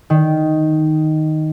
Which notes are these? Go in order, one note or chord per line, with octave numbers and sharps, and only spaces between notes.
D#3